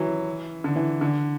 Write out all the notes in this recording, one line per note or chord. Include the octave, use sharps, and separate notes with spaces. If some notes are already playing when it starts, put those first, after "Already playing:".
Already playing: E3 F#3
D3
E3
D3